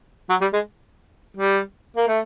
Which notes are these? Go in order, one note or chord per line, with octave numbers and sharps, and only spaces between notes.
F#3
G3
G#3
G3
A#3
A3